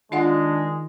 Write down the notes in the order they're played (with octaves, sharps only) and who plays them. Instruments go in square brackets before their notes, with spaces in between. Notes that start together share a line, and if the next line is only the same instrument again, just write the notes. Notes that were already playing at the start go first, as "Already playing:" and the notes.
[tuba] D#3 [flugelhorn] G#3 [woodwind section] D4 [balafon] F4 F5 F#5